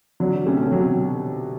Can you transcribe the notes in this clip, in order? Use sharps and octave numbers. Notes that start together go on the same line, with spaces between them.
D3 F#3
C3 A3 C#4
B2
C3 F#3